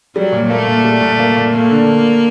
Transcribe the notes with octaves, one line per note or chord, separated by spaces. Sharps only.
F#3 G3
A#2
A3 A#3
A#2
G3
A#2
A#3
A#2
A3 A#3
D3